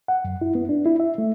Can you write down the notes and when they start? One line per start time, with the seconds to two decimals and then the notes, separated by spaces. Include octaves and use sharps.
0.08 F#5
0.25 F#2
0.41 E4
0.55 B3
0.69 D4
0.86 E4
1.00 E5
1.18 A3